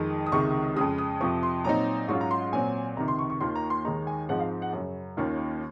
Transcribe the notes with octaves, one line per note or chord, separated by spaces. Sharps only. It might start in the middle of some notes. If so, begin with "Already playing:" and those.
Already playing: F2 D#3 G#3
D#6
C#2 C3 D#3 G#3 C#6
F2 C#3 G#3 D#6
D#6
F2 C3 F3 C#6
C6
A#2 F#3 C4 D#4 A#5
G#2 F#3 C#4 F4 C#6
A#5
C6
A#2 F#3 C4 G#5
C#2 C3 D#3 A#5
C6
C#6
C#6
D#2 D#3 A#3 F4 C6
A#5
C6
D#2 D#3 G#3 D#4 A#5
G#5
G#2 F3 G#3 C4 D#4 F#5
F5
F#5
F#2 C#3 F#3
D#2 D#3 A#3 C#4 F4